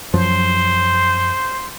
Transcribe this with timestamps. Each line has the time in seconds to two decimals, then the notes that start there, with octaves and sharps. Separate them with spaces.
0.13 F#2 F3 F#3 C5